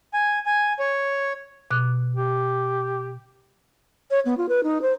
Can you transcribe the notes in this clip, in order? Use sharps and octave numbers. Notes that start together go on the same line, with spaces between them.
G#5
G#5
C#5
B2 D6 F#6
G4
C#5
B3
F4
B4
D#4
C5